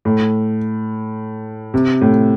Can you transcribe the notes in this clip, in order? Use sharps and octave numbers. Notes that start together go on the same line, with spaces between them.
A2
C3
A2